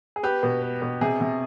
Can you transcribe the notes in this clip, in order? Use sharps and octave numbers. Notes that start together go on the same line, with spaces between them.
G#4
B3 G4 B4
B2
B3
B2
C3 G#4
C3